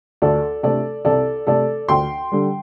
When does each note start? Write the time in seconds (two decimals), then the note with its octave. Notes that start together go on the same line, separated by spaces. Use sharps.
0.22 D2 A4 D5
0.63 C3 A3 D4 A4 D5
1.05 C2 A4 D5
1.47 C3 A3 A4 D5
1.89 D2 G5 C6
2.32 D3 G3